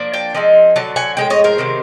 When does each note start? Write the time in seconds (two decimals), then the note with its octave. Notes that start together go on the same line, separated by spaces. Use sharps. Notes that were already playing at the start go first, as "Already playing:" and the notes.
Already playing: F3 A#3 D4
0.14 G5 A5
0.34 F3 G#3 C4 D#4
0.76 D3 F#3 A5
0.96 F#5 G#5
1.17 A2 F3 G#3 G5
1.30 C#5 D#5
1.44 A#4 C5
1.58 C3 D#3 F#3